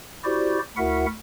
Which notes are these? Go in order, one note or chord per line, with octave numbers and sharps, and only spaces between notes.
E4 F#4 G4 C5 D5
D2 E4 F#4 A#4 E5 F#5